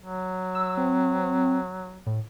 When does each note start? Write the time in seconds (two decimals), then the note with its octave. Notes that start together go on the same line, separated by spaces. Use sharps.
0.01 F#3
0.55 E6
0.77 C4
2.06 A2